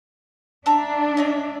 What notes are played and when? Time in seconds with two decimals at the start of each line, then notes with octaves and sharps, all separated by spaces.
0.66 D4 E5 A5 A#5
1.17 C#5 D#5 E5